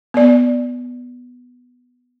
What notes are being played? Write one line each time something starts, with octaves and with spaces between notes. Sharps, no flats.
B3 D5